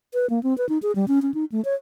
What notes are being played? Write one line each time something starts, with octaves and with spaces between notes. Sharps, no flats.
B4
A#3
C4
B4
D#4
G#4
G3
C#4
C#4
D#4
A3
C#5